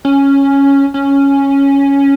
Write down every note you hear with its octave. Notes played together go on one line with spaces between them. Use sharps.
C#4
C#4